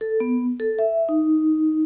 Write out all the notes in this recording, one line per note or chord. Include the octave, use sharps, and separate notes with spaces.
A4
B3
A4
E5
D#4